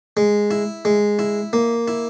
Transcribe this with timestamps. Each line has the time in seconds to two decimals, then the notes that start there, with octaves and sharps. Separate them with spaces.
0.17 G#3
0.51 E4
0.85 G#3
1.19 E4
1.53 A#3
1.88 E4